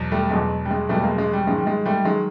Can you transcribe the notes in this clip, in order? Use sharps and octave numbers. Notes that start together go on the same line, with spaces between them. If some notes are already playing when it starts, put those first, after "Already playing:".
Already playing: E2 B2 F#3
G3 A3
E2 B2 F#3 G#3
G3
G#3
E2 B2 F#3 G3 A3
G#3 A#3
G#3
G3
G#2 D#3 F#3 G#3
G3
G#3
G3 A3
D#3 F#3 G#3